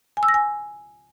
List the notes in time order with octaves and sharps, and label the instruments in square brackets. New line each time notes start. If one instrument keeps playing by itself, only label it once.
[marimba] G#5
E6
A#6
G#5